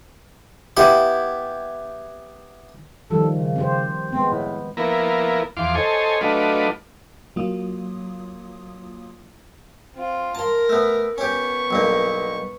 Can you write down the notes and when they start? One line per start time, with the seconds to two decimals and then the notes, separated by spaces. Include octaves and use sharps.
0.77 B3 E4 G4 B5
3.10 D#3 F3 G3 A4
3.30 C#3
3.56 C4 G4 C5
4.12 G#3 B3 C4
4.30 A2
4.77 F3 A#3 B3 E4 A#4
5.57 E2 F3 F5 C6 D6
5.75 A4 C5 C#5 D#5 G#5
6.21 F#3 A3 D4 F4 B4 D#5
7.36 F#3 A#3 F4 D#6
9.94 C4 F4
10.35 A#4 A5 A#5 C6
10.69 A3 B3
11.18 B3 C#4 G4 C#6
11.71 B1 G2 A#3